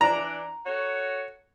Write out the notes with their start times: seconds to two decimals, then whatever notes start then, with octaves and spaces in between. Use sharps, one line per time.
0.01 E3 D4 A#5
0.66 F#4 A4 C#5